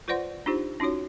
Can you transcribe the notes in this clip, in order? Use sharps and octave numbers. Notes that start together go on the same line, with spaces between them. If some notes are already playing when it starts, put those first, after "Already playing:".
F4 B4 C5 D5 F#5 C6
D4 D#4 F4 G4 C5
C#4 D#4 F4 F#4 C#5